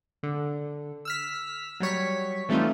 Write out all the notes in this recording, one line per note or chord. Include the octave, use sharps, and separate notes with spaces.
D3
E6 F6 B6
F#3 G3 C#5 B6
E3 G3 A3 C4 D#4 F4